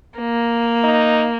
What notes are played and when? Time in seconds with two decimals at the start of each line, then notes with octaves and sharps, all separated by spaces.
0.18 A#3
0.84 D#4